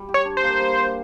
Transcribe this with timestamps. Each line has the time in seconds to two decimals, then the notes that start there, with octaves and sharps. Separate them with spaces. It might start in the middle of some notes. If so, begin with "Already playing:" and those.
Already playing: G3
0.09 G4
0.14 C#5
0.25 D4
0.37 C5
0.43 A#3
0.61 G3
0.77 G4